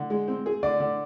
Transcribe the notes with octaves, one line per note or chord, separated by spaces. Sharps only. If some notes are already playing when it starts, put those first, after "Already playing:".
Already playing: D3
G#3
C4
G#4
D3 D5
D3